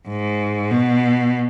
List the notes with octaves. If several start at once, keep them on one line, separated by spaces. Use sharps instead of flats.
G#2
B2